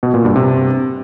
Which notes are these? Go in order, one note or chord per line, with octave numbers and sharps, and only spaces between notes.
B2
A#2
G2
C3